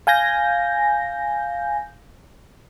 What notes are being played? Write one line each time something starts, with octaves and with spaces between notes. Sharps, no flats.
F5 G#5 G6 A#6